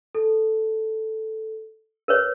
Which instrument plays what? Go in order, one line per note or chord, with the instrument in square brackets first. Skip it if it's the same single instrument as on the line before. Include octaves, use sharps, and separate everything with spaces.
[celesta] A4
[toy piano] A#4 B4 C#5